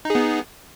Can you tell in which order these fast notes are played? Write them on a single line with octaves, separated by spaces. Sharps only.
D#4 G#4 B3